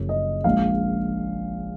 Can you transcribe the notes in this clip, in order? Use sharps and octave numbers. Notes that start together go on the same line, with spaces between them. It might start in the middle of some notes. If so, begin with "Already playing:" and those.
Already playing: F#1 F#2 F3
D#5
A#1 A#2 G#3 F5